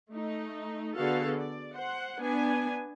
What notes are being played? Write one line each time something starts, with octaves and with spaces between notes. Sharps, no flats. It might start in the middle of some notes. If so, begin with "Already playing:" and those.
A3 D#4
D3 B3 F#4 G#4 A4 F5
D5
C5 F#5
B3 D4 G#5